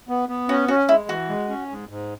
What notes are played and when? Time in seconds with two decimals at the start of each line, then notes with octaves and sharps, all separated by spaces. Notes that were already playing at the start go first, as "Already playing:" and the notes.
0.09 B3
0.29 B3
0.49 C#4 F#4
0.68 C#4 F#4
0.89 G#3 E4
1.09 E3 F#4
1.29 G#3
1.49 C#4
1.69 G#2
1.89 G#2